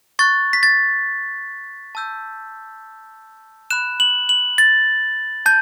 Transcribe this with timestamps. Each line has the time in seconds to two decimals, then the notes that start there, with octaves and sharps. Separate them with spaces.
0.19 C#6 F#6 A6
0.53 B6
0.63 A6
1.95 A5 E6 G6
3.71 B5 F#6 E7
4.00 F#7
4.29 F#7
4.58 A6
5.46 A5 G6